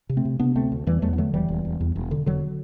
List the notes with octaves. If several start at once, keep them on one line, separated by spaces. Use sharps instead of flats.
C3
A3 C4
C3
C3 B3 D4
D2 A3 C4
D2
E2 E3 G3
E2 F#3 A3
B3
D3 F#3 A3
E1 E3 G3
E1
E1
E2
E1
D3
E1 D3 F#3